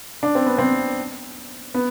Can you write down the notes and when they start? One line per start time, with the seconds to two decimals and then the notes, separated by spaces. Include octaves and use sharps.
0.23 D4
0.35 C4
0.46 B3
0.58 C4
1.74 B3